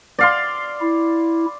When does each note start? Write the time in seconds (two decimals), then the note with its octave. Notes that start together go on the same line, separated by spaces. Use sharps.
0.18 D5 F5 C6
0.81 E4